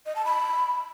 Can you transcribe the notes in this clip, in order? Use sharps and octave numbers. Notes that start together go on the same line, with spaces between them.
D#5
A5
B5